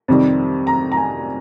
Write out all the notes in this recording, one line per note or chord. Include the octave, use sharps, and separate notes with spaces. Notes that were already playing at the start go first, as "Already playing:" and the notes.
F2 C3 D#3 G3
A#5
A#5
G#5